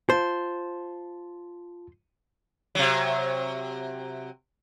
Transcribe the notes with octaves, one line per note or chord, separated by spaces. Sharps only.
F4 C5 A5
C3 F#3